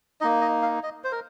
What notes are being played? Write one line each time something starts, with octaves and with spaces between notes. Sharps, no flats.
A#3 D#4 D#5
D#5
F5
D#5
C5
A#4